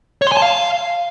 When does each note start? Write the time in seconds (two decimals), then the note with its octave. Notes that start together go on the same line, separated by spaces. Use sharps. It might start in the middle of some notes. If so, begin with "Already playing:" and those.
0.22 C#5
0.27 C6
0.32 G#5
0.37 A5
0.42 F5